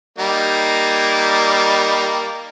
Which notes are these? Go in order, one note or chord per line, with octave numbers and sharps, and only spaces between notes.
G3 A#3 D#4